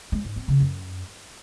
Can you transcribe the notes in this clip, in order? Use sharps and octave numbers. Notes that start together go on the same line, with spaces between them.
G#3
G#2
C4
C#3
F#2